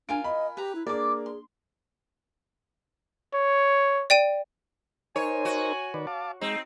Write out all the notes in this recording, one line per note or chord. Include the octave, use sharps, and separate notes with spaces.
D4 F4 A#4 G#5 D7
D#5 B5
G4 B4 A#5
E4
A#3 D4 G#4 D5 D6
C6
C#5
D5 G5 D#7
D#4 A#4 C5 C#5 G#5
F#4
D#3 B4 D5
F5 A5 D6
G#3 C4 D#4